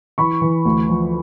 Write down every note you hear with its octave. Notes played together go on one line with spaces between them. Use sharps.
E3 B5 C#6
E3
D2
F3